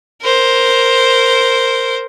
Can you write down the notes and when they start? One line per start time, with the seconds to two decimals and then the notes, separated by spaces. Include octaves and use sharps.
0.22 A#4 C5